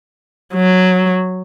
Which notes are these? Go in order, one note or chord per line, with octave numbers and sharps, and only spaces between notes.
F#3